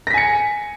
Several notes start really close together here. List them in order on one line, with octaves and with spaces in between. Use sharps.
A#6 B6 G#5 C#7